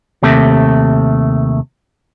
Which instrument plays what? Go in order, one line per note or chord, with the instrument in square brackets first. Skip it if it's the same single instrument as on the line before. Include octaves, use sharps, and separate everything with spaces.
[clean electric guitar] D#2 C3 A3